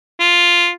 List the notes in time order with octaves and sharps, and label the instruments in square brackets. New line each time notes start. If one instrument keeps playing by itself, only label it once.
[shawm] F4